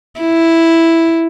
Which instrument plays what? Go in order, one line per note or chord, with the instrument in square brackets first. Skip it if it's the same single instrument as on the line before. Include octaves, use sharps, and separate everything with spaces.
[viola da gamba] E4